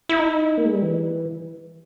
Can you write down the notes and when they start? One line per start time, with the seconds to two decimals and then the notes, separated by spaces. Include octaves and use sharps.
0.09 E4
0.19 D#4
0.58 A#3
0.65 G#3
0.73 G3
0.82 E3